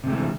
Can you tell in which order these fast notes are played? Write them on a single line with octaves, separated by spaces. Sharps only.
C3 G#3 A3 E3